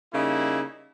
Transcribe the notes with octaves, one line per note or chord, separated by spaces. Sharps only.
C#3 G3 A#3 D#4 E4